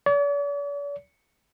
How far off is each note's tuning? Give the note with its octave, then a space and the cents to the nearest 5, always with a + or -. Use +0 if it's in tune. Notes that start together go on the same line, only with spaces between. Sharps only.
D5 -45